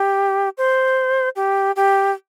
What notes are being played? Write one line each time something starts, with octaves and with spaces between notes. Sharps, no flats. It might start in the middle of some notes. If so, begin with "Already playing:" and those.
Already playing: G4
C5
G4
G4